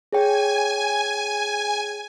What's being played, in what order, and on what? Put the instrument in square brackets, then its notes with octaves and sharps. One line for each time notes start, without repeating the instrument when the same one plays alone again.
[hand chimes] G#4 C#5 G5 [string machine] G#5